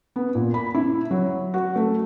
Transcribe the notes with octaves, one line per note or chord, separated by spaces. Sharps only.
B3
A#2
B5
E4
F#3
F#4
A3